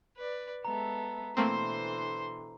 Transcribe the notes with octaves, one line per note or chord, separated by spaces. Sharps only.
B4 D5
G#3 B3 A4 E5 A#5
B2 D3 E3 A3 A#3 C4 C5 C6